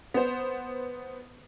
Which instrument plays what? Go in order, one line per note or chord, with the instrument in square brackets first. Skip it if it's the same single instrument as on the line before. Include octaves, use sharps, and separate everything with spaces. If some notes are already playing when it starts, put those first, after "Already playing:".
[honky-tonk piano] B3 C5